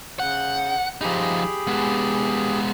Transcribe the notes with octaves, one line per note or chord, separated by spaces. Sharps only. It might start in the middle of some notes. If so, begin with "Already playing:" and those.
C#3 F#5 G6
F3 D#4 G4 G#4 B5
G#3 B3